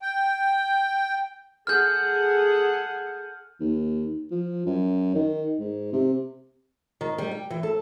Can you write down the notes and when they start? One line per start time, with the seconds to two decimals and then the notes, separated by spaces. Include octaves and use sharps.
0.02 G5
1.67 G#4 A4 F#5 F6 G6
3.60 D#2
4.31 F3
4.66 F#2
5.15 D#3
5.59 G#2
5.93 C3
7.01 D#3
7.18 G3
7.31 G5
7.50 E3
7.63 A4